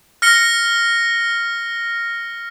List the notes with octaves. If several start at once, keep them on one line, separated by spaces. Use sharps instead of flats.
F6 A#6 C#7 G7